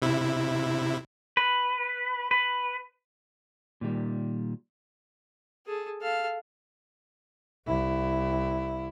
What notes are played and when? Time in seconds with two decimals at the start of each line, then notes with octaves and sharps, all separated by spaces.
0.02 C3 E4
1.37 B4
2.31 B4
3.81 A#2 D#3 G3
5.66 G#4 A4
6.02 A4 F5
7.66 C2 E4